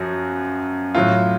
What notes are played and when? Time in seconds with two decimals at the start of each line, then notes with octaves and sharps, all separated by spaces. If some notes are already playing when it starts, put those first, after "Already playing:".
Already playing: F#2 F3 F#4
0.95 A2 F#3 F4